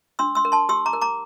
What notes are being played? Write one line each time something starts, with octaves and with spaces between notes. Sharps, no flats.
D4 C6 E6
C6 E6
A#4
A5 C6
G4 C6 E6
A#5 D6
A#4
A#5 D6